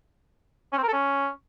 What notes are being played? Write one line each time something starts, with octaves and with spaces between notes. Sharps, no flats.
C#4
C4
A#4
A4
C#4